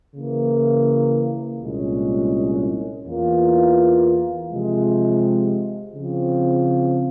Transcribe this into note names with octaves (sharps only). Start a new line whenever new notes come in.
C#3 E3 A#3
C2 A#2 G#3 C#4
E2 E3 A#3 F4
C3 F3 G#3
C#3 F3 C4